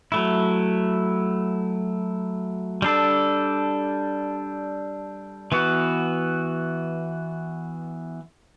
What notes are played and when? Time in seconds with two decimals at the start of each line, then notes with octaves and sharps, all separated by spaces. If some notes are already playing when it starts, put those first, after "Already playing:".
0.12 F#3 A3 E4
2.82 G3 D4 A4
5.52 E3 B3 F#4